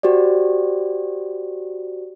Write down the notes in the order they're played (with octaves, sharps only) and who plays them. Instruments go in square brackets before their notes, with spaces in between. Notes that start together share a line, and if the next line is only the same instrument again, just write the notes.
[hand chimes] F#4 G4 C5 D5